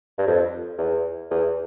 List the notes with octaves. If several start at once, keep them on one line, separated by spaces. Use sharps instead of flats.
G2
F2
E2
E2